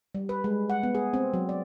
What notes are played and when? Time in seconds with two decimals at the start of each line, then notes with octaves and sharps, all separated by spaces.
0.15 G3
0.29 B4
0.44 G#3
0.70 F#5
0.83 B3
0.95 G#4
1.14 C4
1.34 F#3
1.49 D5